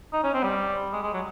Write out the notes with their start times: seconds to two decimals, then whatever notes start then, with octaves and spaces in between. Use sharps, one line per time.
0.13 D#4
0.24 C#4
0.34 C4
0.43 G3
0.93 G#3
1.03 G#3
1.13 F#3